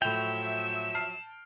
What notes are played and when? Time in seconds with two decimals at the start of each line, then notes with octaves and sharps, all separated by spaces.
0.02 A2 F3 F#3 E5 G5 E7 F7
0.95 A5 F6 C7